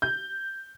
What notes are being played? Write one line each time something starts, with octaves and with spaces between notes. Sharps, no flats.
G6